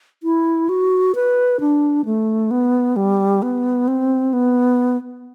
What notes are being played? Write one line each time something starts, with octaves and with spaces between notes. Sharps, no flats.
E4
F#4
B4
D4
A3
B3
G3
B3
C4
B3